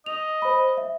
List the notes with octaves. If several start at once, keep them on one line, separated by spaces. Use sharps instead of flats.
D#5 F7
C5 B5
E5